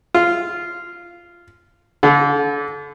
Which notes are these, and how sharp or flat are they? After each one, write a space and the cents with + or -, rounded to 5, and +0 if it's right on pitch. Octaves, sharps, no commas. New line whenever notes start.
F4 -10
D3 -40